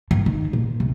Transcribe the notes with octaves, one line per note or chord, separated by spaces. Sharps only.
G2
D#3
A#2
C2